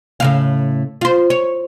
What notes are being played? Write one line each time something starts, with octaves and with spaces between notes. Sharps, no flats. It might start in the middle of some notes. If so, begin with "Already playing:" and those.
A2 C#3 F5
F4 C5
C#5